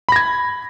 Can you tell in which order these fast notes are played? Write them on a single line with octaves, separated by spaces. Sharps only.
B5 A#6 G#6